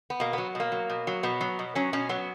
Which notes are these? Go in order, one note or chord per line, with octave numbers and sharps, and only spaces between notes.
B3
B2 A#3
F#3 B3
B2 A#3
F#3
B2
F#3
B2 B3
F#3
B2
F#3 C#4
B2 C#4
F#3 B3